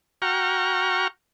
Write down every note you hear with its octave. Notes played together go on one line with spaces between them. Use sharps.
F#4 G5 A#5 C#6 F6